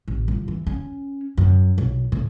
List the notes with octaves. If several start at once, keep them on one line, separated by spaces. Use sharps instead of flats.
A1
G1
E3
C#4
F#2
B1
A2